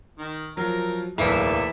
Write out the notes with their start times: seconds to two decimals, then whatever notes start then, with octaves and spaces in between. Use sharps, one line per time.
0.19 D#3
0.57 F3 F#3 A#4
1.18 D1 B1 E2 E3 A3 A#3